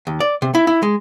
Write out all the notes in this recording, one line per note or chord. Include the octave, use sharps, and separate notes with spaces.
D#2
D5
C3
E4
E4
G#3